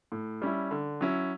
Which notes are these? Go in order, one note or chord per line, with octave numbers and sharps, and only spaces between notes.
A2
G3 C#4 E4
D3
F#3 C#4 E4